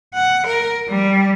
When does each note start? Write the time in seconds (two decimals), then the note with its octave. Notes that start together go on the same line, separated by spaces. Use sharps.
0.14 F#5
0.47 A#4
0.89 G3